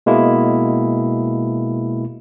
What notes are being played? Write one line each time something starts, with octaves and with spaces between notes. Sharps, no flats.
B2 G#3 A#3 E4